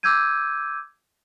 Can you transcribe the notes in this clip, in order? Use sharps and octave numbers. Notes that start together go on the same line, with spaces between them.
D6 E6 G6 G#6 D#7